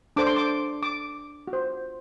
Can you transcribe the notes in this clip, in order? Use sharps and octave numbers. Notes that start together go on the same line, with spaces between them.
D4 A4 C5 D6
C6
D6
D6
F#4
C5